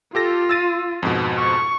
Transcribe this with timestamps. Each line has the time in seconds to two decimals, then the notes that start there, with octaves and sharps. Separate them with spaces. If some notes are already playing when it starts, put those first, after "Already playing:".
0.15 F4 G4 A4 A#6
0.49 E6 A6 D#7
1.03 F2 G#2 B2
1.39 C#6